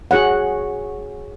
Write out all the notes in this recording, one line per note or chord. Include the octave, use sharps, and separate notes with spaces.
F#4 G#4 C#5 F#5